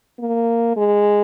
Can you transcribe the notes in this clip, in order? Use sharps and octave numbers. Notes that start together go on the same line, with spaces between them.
A#3
G#3